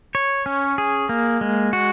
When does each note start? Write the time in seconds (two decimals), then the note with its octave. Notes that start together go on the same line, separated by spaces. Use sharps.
0.15 C#5
0.46 C#4
0.78 G#4
1.09 A#3
1.41 G#3
1.73 F#4